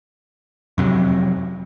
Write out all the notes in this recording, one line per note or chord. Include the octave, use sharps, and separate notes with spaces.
F2 C3 F#3